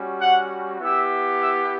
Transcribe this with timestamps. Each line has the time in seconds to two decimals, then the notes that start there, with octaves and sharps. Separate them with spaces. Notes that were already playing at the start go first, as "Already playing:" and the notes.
Already playing: G3 C#4 F#4
0.20 F#5
0.81 B3 E4 G4 E5
1.41 E5